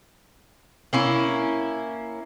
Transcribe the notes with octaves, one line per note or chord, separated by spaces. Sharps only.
A#3 C#4 E4